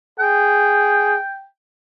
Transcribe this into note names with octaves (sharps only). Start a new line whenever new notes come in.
G#4 G5